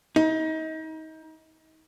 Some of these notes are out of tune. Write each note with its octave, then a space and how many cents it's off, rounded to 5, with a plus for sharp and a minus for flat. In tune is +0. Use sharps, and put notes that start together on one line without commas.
D#4 +30